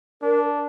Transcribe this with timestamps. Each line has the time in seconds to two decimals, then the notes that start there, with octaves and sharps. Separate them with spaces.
0.22 D4 A#4